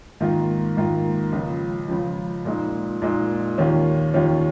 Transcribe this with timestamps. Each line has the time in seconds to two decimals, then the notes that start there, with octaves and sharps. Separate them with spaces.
0.20 G#2 D#3 A#3 F4
0.77 G#2 D#3 A#3 F4
1.32 C#2 C#3 F3
1.88 C#2 C#3 F3
2.45 A#2 G#3 D#4
3.02 A#2 G#3 D#4
3.58 D#2 D#3 C#4 F4
4.14 D#2 D#3 C#4 F4